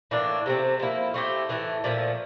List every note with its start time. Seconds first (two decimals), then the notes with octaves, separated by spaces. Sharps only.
0.11 A2 E3 A#3 D4
0.46 C3 E3 A3 C4
0.80 F3 A#3 E4
1.14 A3 C4 E4 G4
1.49 A2 E3 A3
1.84 A#2 F3 A3